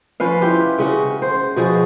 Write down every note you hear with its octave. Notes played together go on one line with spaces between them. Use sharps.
F3 C#4 B4 F5
E4 F4 G4
C#3 C#4 F#4
C5
B2 F3 F#4 G#4